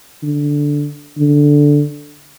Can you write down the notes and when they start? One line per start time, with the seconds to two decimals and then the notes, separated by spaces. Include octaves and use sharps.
0.23 D3
1.18 D3